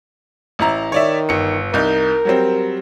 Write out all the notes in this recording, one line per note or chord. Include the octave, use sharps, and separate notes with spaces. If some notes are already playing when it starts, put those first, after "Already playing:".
A1 E4 A#5
D#3 C#5 D5 E5
G1 C#7
C2 D#4 A#4 G6
F#3 G3 C4